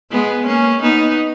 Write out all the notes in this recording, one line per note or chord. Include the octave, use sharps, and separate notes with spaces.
G#3 B3
A#3 C#4
B3 D#4